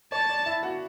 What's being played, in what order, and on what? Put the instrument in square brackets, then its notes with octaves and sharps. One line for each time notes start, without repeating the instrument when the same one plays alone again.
[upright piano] C#5 [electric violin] A5
[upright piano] D5
E4 E5
F#4 F#5